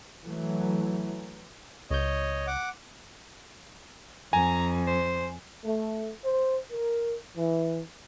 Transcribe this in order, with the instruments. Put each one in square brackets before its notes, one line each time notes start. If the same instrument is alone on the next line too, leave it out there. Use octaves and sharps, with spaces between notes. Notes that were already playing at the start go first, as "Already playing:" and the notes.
[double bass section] E3 F#3 A3
[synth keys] C#2 G6 [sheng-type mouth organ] C#5 D#5
[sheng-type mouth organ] F#5 D6
[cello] F2 [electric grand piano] G#5 [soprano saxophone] A#5
[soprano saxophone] C5
[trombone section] A3
C5
A#4
E3